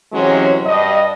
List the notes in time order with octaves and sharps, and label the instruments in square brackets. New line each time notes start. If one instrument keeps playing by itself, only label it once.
[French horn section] C3 E3 F#3 G#3 C4 C#4
G2 D#5